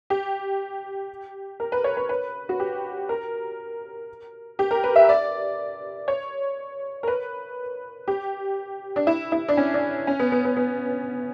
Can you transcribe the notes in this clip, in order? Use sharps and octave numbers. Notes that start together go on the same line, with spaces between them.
G4
A#4
B4
C#5
B4
B4
F#4
G4
A#4
G4
A#4
B4
E5
D5
C#5
A#4
B4
G4
D4
E4
E4
D4
C#4
D4
C#4
B3
B3
B3
B3